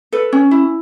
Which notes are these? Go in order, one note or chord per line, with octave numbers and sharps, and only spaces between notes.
A4 B4
C#4
E4